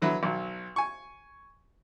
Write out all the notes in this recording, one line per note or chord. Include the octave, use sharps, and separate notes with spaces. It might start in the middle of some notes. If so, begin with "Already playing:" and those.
D3 F#3 E4 B4
B1 F#3
G#5 C#6